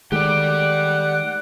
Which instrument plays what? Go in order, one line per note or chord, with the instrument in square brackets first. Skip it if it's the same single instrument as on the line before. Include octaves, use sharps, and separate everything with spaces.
[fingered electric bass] D#3 G#3 A3 [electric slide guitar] G4 D5 [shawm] F#5 [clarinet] D6